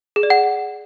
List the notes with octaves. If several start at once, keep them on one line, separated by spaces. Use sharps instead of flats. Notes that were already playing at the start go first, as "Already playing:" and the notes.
G#4
D5
F#5